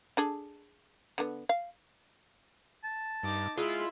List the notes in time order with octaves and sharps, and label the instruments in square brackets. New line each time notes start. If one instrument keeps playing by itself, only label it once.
[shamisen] D4 G#4 A4
D3 B3
F5
[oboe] A5
[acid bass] G2 [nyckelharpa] D#4 D6
[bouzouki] G#3 [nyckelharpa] E4 B5 [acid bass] F4